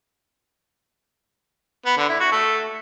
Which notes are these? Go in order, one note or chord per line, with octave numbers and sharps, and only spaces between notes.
B3
D3
E4
F#4
A3